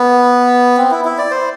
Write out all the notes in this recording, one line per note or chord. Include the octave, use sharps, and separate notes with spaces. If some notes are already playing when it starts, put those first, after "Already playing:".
Already playing: B3
C4
E4
E4
D5
C5